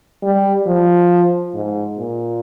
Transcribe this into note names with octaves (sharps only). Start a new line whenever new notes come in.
G3
F3
G#2
A#2